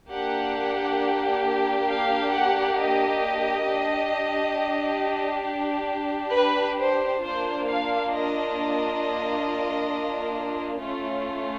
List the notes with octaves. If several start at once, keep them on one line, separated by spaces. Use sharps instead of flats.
A#3 D4 G4 F#5
F5
F#5
D#5
D4 G4
B4
C5
A#3 D4 F4 C5
F5
D#5
A3 C#4 F4